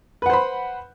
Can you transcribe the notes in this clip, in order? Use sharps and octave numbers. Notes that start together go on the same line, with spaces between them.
B4 C5 F#5 B5